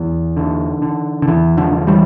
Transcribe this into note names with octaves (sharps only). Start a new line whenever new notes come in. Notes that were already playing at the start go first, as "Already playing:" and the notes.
Already playing: E2 E3
D3
D3
D3
E2 E3
D3 F3
D3
E3 G3